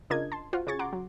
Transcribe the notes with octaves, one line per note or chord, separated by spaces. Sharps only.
C#3 D4 F4 A#4 D#5 G#6
A5 C6
F4 F#4 C5
C#3 C#4 G#4 C#6 G#6 A6
F#5 A#5 C6 D6
F#3